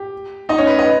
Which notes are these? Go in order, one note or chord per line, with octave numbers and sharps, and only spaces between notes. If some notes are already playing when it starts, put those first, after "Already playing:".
Already playing: G4
D#4 D#5
C#4 C#5
B4
D#5